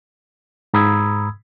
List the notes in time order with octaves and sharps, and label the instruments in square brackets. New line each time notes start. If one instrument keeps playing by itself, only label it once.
[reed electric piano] G#2 A#5 B5 D#6 E6 G#6